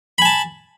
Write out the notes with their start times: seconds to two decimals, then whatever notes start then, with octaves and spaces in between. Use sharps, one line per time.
0.18 B5
0.22 G#5
0.25 A5